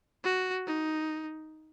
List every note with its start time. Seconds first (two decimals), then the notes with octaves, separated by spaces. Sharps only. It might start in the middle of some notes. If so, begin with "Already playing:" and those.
0.24 F#4
0.67 D#4